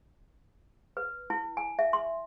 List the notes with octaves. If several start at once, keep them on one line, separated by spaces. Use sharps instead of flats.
B4
E4
G#5
E5
C6